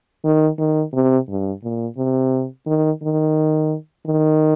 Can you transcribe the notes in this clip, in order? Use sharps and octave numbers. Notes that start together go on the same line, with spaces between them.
D#3
D#3
C3
G2
A#2
C3
D#3
D#3
D#3